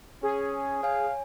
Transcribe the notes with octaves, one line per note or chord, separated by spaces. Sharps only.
C#4 G#4
C#5 F5 G#5